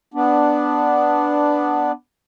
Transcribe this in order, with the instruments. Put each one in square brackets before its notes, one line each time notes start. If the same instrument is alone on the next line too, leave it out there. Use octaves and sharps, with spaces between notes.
[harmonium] B3 D4